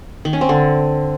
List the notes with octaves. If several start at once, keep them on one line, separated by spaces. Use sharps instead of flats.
D#3
C#4
C4
D3